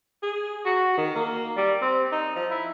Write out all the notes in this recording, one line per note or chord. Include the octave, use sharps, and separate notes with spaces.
G#4
F#4
D#3
A#3
G3
C4
D#4
F3
E4